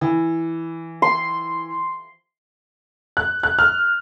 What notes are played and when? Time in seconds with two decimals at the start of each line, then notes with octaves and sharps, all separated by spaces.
0.01 E3
1.02 C6
3.17 F#6
3.43 F#6
3.59 F6